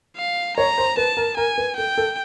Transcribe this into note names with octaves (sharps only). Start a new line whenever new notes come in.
F5
C#5 A#5
C5
B4 A5
A#4
A#4 G#5
B4
A4 G5
A4